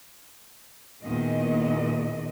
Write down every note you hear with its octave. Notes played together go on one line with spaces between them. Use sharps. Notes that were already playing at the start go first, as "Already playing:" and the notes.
E2 A#2 D#3 D#5